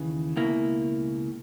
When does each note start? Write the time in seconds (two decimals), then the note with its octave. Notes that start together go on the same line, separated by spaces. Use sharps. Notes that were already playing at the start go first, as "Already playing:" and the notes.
Already playing: D#2 C#3 E3
0.36 C#2 B2 A#3 E4